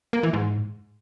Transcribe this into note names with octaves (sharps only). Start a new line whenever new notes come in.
A#3
E3
G#2